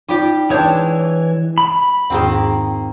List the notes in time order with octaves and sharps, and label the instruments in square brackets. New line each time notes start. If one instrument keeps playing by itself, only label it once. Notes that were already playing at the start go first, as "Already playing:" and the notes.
[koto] G3 G4 D5 [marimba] D#4 F4
[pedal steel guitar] E3 C#5 [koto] G#3 D4 [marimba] G5 G6
[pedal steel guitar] B5
[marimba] E2 G#2 G#4 [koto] D#3 A#3 C4